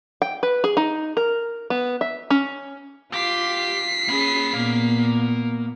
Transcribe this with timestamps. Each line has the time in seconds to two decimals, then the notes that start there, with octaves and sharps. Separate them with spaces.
0.22 G5
0.43 B4
0.64 G#4
0.77 D#4
1.17 A#4
1.70 B3
2.01 E5
2.30 C#4
3.13 F4 G4 B6 C7
4.08 A#3 C#4 G#4 B5
4.54 A#2 A#3 B3